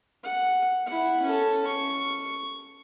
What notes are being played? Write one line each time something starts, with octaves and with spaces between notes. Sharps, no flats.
F#5
E4 F#5
C#4 A4
C#6